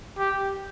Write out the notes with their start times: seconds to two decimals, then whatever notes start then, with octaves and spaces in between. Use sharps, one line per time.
0.18 G4